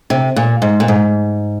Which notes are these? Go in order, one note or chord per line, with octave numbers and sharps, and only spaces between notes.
C3
A#2
G#2
A#2
G#2